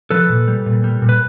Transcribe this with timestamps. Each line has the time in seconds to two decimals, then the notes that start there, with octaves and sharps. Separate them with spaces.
0.11 F3 A4 B4
0.29 A#2
0.48 G3
0.66 A#2
0.84 G3
1.02 A#2
1.09 B4